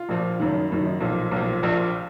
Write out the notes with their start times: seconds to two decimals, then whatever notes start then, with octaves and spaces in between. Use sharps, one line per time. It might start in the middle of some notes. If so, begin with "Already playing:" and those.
Already playing: F4
0.09 A#1 A#2 F3
0.40 F#1 F#2 D#3
0.70 F#1 F#2 D#3
0.86 D#4
1.01 B1 A#2 F3
1.31 B1 A#2 F3
1.63 A#1 A#2 F3 F4